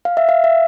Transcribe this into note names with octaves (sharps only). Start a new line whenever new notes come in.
F5
E5
F5
E5